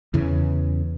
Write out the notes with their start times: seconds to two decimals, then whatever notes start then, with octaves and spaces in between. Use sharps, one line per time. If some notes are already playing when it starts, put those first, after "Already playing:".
0.14 E2 C#3 E3